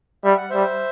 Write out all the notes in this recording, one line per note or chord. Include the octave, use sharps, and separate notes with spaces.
G3 E5
F#5
G3 C5 E5